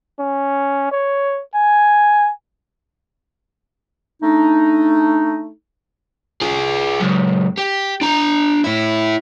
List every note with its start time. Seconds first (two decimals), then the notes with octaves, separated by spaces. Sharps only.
0.20 C#4
0.92 C#5
1.55 G#5
4.23 A3 D4 D#4
6.42 F4 G#4
7.01 C#2 F#2
7.58 G4
8.02 D4 A#5
8.64 A2 E4